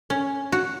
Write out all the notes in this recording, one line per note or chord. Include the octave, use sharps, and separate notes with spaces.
C#4
F#4